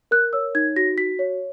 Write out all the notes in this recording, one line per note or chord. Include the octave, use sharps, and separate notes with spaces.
A#4 F#6
C#5 E6
D#4 G#6
F#4 A#6
F#4 B6
C#5